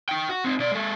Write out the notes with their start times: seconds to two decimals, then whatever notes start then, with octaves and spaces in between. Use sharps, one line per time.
0.09 D#4 G5
0.29 F#4
0.45 C4 D#4
0.59 B2 D5
0.72 G#3 A4